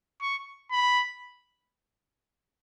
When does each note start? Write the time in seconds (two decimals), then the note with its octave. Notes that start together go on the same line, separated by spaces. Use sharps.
0.22 C#6
0.72 B5